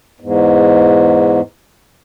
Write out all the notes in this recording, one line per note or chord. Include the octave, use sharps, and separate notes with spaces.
E2 G#2